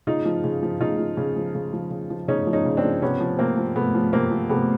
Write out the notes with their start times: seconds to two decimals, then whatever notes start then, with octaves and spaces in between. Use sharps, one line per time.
0.07 C#3 D#4 F4
0.25 F3
0.44 C#3
0.63 F3
0.80 C#3 D#4 F4
0.99 F3
1.17 C#3
1.36 F3
1.55 C#3
1.73 F3
1.91 C#3
2.10 F3
2.28 C#3 C#4 D#4
2.47 F3
2.53 C#4 D#4
2.65 C#3
2.77 C4 D4
2.84 F3
3.02 C3 B3 C#4
3.20 F3
3.39 C3 A#3 C4
3.57 F3
3.76 C3 A3 B3
3.94 F3
4.13 C3 A#3 C4
4.31 F3
4.49 C3 A3 B3